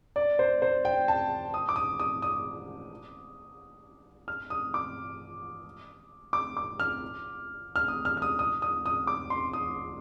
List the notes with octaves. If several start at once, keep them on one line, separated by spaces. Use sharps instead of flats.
D5
C5
C5
G5
A5
D#6
D6
D#6
D#6
D#6
F6
D#6
D6
D6
D6
F6
F6
D#6
F6
F6
D#6
D#6
D#6
D#6
D6
C6
D#6